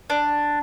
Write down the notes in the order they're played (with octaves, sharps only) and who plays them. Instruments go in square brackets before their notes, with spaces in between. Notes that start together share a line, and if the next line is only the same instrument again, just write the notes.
[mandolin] D4